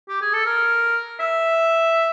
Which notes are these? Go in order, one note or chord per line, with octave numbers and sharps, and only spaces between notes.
G4
G#4
A4
A#4
E5